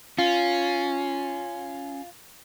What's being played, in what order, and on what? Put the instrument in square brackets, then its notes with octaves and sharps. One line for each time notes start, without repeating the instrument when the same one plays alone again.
[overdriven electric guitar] C#4 [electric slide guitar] F4